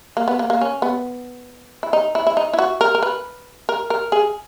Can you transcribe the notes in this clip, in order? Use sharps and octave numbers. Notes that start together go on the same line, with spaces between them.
A#3
B3
A#3
A#3
C#4
B3
E4
D#4
E4
E4
D#4
E4
F#4
A#4
A#4
B4
A#4
A#4
G#4